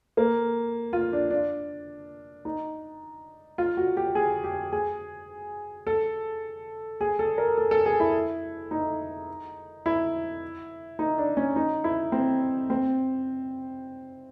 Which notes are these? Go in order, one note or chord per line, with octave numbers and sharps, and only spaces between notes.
A#3
F4
D4
D4
D#4
F4
F#4
G4
G#4
G4
G#4
A4
G#4
A4
A#4
A4
A4
G#4
E4
D#4
E4
D#4
D4
C#4
D#4
E4
C4
C4